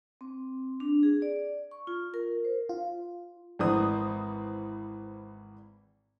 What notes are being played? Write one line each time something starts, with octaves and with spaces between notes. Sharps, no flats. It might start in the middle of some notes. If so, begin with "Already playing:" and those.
C4
D4
G#4
D5
C#6
F4
A#4
C5
F4
G#1 E3 C5 D#6